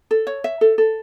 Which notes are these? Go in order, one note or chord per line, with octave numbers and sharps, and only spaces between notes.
A4
C#5
E5
A4
A4